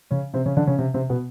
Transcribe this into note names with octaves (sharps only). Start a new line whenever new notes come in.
C#3 C#4
C3 C4
C#3 C#4
D3 D4
C#3 C#4
C3 C4
C3 C4
B2 B3